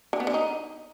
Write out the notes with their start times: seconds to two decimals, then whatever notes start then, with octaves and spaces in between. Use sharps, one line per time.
0.13 D3
0.20 B3
0.27 D3
0.34 D#4